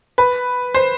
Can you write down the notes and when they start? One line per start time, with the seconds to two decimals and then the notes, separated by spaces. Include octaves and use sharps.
0.18 B4
0.74 C5